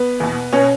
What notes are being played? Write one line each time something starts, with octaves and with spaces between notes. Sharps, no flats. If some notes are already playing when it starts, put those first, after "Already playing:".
Already playing: B3
E2 B2
B2 C#4